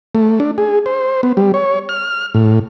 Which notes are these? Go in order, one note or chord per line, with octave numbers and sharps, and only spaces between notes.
A3
D4
G#4
C5
B3
G3
C#5
F6
A2